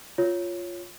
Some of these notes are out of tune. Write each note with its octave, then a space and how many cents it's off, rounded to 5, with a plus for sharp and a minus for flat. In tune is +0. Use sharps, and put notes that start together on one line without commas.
F4 +0 C#5 +0